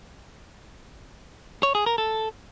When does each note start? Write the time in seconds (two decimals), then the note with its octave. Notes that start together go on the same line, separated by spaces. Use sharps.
1.63 C#5
1.75 G#4
1.86 A#4
1.98 A4